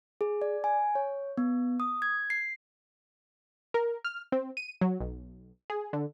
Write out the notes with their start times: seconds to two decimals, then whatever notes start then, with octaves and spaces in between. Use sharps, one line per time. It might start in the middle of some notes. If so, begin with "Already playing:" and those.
0.21 G#4
0.42 D5
0.64 G#5
0.95 C#5
1.38 B3
1.80 D#6
2.02 G#6
2.30 C7
3.74 A#4
4.05 F6
4.32 C4
4.57 D#7
4.81 F#3
5.01 B1
5.70 G#4
5.93 D3